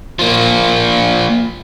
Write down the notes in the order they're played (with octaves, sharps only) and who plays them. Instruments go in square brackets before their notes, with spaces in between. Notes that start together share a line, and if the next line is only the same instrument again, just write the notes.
[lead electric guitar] F3 A#3